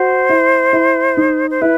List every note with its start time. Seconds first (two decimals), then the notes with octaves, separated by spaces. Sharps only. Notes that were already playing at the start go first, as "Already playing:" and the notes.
Already playing: F#4 C5
0.29 E4
0.73 E4
1.17 D#4
1.50 C5
1.62 E4 B4